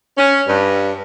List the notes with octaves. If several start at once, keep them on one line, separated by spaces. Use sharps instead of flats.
C#4
G2